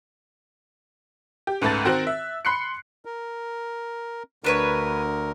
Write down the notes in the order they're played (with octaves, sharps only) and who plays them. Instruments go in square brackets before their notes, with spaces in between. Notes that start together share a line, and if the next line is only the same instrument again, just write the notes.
[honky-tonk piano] G4
C#2 G#2 A3 B4 A5 A6
D#3 C4 F#4 A#4 C5 F#6
E5
B5 C6 F#6 C7 C#7
[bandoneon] A#4
[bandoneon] D2 D3 A#4 [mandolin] D4 B4 C#5